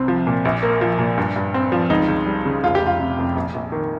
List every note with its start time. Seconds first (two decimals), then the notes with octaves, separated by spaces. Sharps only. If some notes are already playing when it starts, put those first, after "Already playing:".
Already playing: C2 C3 C4
0.08 F3
0.27 A#2
0.45 A#1
0.62 A#3
0.81 F3
0.99 A#2
1.18 G2
1.36 G2
1.54 C4
1.72 F3
1.90 C#2 D#4
2.08 C#2
2.26 G3
2.46 C#3
2.64 F1 F4
2.75 G4
2.81 F1
2.87 F4
3.00 C3
3.18 F2
3.36 A#1
3.54 A#1
3.72 D#3